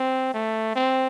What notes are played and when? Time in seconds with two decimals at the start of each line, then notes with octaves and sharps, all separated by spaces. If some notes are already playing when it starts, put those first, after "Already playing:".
Already playing: C4
0.34 A3
0.75 C4